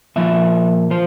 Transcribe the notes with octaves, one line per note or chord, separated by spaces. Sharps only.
A#2 F3 E5
F3 C5